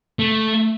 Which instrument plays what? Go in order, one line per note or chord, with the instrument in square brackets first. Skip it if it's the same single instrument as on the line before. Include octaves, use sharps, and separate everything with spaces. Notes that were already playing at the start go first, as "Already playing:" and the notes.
[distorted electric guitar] A3